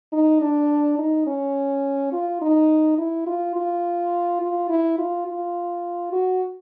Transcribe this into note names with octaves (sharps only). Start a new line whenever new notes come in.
D#4
D4
D#4
C#4
F4
D#4
E4
F4
F4
F4
E4
F4
F4
F#4